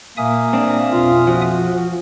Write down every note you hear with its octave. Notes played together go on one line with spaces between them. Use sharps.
A#2 A#3 E5 G#5 D#6
C4 D4
B1 F2 F4
F3 F#4